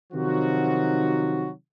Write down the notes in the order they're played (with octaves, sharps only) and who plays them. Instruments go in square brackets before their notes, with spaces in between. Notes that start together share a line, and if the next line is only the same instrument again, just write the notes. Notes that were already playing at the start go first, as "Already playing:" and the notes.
[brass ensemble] C3 D#3 F3 F#3 D#4 F#4